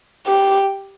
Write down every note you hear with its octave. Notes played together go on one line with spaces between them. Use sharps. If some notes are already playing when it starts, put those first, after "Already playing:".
G4